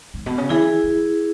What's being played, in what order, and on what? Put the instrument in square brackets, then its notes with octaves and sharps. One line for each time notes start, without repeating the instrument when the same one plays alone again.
[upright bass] G#2
B2
C#3
[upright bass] E3 [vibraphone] E4 G#4
[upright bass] E3